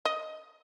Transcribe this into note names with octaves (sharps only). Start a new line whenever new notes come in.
D#5